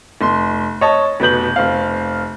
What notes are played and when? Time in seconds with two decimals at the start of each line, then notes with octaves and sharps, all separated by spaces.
0.21 F1 C6
0.81 C#5 D#5 A5
1.20 F1 B2 B4 G6 F#7
1.56 F1 C4 F5